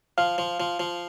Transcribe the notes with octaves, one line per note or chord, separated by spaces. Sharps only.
F3 F5
F3
F3
F3